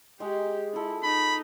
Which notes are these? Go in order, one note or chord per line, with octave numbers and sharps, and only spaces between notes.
G#3 G4 G#4 C#6
E4 F4 A4
D#4 B5